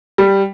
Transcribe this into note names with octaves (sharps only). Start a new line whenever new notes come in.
G3